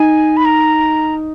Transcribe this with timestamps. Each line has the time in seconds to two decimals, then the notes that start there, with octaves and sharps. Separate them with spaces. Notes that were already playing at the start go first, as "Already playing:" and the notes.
Already playing: D#4 G#5
0.37 B5
0.45 A#5